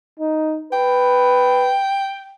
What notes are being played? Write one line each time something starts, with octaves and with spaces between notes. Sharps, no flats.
D#4
B4 G5